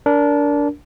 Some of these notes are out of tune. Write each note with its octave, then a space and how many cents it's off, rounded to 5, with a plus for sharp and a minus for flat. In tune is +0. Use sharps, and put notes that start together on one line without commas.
D4 -20 A#4 +0